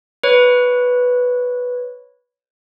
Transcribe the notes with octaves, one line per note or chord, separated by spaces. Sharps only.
B4 C#5